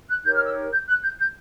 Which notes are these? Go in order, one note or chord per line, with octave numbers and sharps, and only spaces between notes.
F#6
D#4 G4 A#4 C#5 G6
F6
E6
G6
F#6
G6
G6